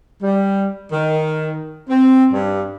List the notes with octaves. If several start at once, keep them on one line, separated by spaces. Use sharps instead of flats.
G3
D#3
C4
G2